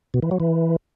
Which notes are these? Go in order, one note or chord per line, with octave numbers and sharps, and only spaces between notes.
B2
E3
F#3
E3